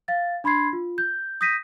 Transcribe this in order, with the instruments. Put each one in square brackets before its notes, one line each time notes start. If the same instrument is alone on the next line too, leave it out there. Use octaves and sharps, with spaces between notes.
[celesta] F5 A6
D4 B5 C6 G#6 C7
F4
G6
D#6 G6 A#6 B6 D#7